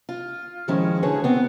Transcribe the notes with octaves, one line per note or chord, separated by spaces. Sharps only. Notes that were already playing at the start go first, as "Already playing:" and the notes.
F4
D#3 F3 G#3 C#4 E4
D3 F#4 G#4 B4 C#5
B3 C4